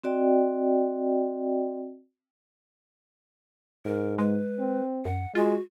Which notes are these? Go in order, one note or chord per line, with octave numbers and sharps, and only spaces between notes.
C4 F#4 D5 D#5 G5
G#2 A#4
G#3 B4
C4
F#2 F#5
G#3 F4 F#4